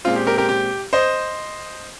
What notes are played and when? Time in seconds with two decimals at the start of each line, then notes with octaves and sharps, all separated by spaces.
0.05 A#2 G#3 C4 F4
0.16 G4
0.27 G4 A#4
0.38 G4 A#4
0.49 G4
0.93 C5 D#5